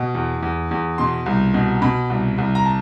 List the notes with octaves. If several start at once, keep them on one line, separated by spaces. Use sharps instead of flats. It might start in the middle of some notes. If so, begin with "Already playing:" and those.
Already playing: B2
E2
E2
E2
B2 C6
C2
B2
B2 B5
C2
C2
A#5
A5